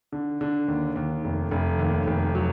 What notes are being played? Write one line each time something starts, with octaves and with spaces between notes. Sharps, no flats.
D3
D3
D#2
D#2
F1
F1
D#2
F1
F#3